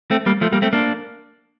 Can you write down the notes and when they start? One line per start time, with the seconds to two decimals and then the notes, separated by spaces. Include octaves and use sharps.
0.11 A3 C4
0.26 G3 A#3
0.41 F3 A3
0.52 G3 A#3
0.62 A3 C4
0.73 A#3 D4